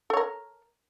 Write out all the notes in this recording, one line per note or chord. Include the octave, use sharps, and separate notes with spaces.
A4 A#4 C#5